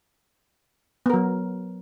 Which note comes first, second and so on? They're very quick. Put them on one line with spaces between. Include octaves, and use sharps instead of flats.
B3 A#4 F#3